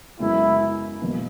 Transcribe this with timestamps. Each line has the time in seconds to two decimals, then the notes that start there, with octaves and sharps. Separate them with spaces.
0.19 F#2 C#3 G#3 B3 E4
1.00 E1 E2 B2 A#3